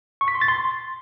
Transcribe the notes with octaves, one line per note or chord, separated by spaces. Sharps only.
C#6
B6
C6
A6
C6